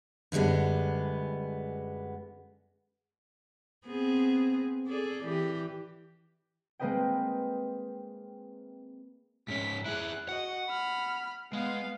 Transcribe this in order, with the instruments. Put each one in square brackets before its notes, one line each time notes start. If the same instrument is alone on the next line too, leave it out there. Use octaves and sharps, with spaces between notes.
[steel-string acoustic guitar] F#2 D3 G3 G#3 B3
[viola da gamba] B3 C4 G#4
G#4 A4 D5
E3 G4
[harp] G#3 A#3 C4 B4 D#5 G5
[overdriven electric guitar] G#2 C#4 [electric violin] B6
[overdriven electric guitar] E4 G#4 [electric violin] F#6
[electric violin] F#4 D#5 [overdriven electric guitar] F#5
[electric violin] B5 F6
[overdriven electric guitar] G#3 [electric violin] B3 F5